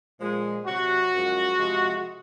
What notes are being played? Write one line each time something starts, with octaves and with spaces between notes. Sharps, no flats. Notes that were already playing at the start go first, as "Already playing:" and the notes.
A#2 F3 G#3
C3 F#3 F#4
F#2 F3 G#3
C3 F3 G#3